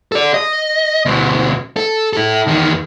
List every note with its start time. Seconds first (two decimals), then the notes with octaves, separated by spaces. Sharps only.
0.12 A4 D5
0.34 D#5
1.06 D2 B2
1.77 A4
2.13 E4 A4
2.48 E2 D#3